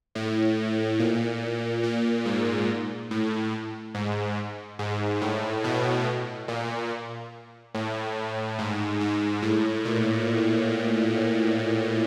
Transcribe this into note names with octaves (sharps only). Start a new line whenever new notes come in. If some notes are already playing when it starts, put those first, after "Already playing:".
A2
A#2
A#2
G#2
A2
G#2
G#2
A2
B2
A#2
A2
G#2
G#2
A2
A#2